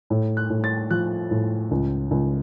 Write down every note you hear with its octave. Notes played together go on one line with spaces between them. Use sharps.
A2
F#6
A2
A6
F3 F#6
A2
C#2
C#2